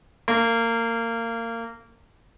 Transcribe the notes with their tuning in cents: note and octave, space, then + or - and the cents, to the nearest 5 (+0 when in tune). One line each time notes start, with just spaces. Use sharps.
A#3 -25